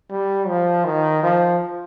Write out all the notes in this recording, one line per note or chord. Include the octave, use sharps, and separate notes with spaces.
G3
F3
D#3
F3